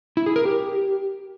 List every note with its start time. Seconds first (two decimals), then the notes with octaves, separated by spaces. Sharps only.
0.17 E4
0.26 G#4
0.36 A#4
0.45 G4